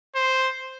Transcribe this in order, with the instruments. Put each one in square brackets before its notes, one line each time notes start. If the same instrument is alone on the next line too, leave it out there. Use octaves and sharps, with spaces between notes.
[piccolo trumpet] C5